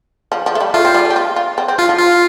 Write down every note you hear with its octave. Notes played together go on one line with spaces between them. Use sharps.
F3
F3
A3
G3
A3 F4
C4
G3
A3
G4
F4
F4
C4
C4
F3 F4
F3
F4